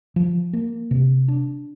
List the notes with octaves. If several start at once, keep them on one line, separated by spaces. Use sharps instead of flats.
F3
A#3
C3
D4